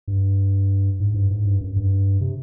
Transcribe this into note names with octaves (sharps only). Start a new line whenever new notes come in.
G2
G#2
G2
G#2
G2
F#2
G2
C3